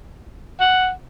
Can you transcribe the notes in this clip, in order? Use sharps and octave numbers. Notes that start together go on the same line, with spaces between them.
F#5